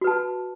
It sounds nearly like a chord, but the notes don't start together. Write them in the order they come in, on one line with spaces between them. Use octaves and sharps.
F#4 B4 A5